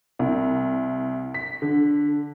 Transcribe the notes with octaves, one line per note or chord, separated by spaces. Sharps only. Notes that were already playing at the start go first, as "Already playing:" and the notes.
C2
B6
D3